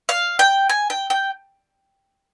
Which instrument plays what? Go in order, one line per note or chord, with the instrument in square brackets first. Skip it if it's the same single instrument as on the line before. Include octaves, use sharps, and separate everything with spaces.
[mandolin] F5
G5
G#5
G5
G5